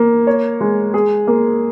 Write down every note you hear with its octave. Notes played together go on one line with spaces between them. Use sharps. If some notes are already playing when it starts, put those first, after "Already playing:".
Already playing: A#3
C#5
G#3
G#4
A#3